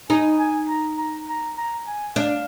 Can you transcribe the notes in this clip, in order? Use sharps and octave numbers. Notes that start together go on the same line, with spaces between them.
D#4 G#5
G#5
A#5
A#5
A#5
A#5
G#5
D4 F5